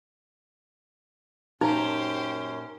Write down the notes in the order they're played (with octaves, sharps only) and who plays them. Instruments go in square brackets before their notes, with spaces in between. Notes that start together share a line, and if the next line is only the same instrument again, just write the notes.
[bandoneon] F#2 C#4 [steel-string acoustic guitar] A#2 A#4 A#5 [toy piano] D#4 [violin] G4 C5